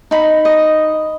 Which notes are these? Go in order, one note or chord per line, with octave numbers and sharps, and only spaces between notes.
D#4 B5
D#5